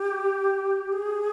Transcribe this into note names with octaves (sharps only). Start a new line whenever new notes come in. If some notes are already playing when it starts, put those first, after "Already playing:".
Already playing: G4
G#4